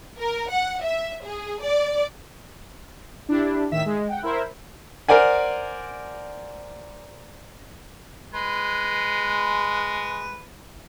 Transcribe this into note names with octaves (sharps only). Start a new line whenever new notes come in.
A#4
F#5
E5
G#4
D5
D4 E4 G4
A2 D#3 E5 B6 E7
G#3
F#5 G5
E4 A#4 C5 E5
A#4 C5 D5 F#5 G#5
G#3 B4